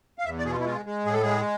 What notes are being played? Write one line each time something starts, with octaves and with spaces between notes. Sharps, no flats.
F5
E2 E5
D5
B2 G#4
F4
E4
G#3 F4
G#3
A2 G#4
A4
G#3 G#4